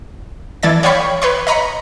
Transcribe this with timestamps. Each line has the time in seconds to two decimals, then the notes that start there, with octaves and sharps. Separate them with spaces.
0.63 E3 A4 D5 G#6 A6
0.83 C#5 D5 F5 G5 B5 C#6
1.22 B4 C#5 C6
1.47 D#5 A#5 B5 C#7